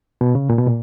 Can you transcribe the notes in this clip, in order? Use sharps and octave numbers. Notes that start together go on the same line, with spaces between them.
B2
C#3
A#2
B2
A#2